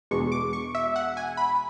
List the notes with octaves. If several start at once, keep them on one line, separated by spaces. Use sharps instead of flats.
E2 B2 G#3 D4 C#6
D6
C#6
E5
F#5
G#5
B5